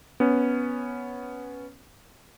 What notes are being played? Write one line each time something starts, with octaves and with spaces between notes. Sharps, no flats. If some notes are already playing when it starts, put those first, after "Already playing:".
B3 C#4